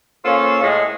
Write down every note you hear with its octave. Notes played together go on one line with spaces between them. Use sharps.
A#3 C#4 F4 A4 C5 F5
A2 G#3